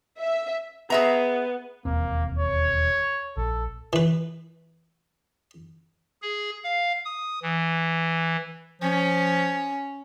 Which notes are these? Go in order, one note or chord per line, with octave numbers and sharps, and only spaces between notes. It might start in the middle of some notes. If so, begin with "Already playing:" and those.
E5
B3 G#4 E5 A#5
E1 D#2 A#3 C4
C#5
A#1 A4
E3 B4
G#4
F5
D#6
E3
F3 C#4